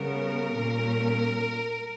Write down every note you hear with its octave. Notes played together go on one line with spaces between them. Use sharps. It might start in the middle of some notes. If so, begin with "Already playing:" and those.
Already playing: C#3 G3 B3 A#4
A#2 G3 C#4